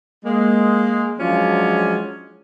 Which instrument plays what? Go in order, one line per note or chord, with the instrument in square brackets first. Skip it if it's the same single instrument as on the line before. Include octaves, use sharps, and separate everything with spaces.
[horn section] G#3 A#3
F3 F#3 G#3 C#4 D4 F4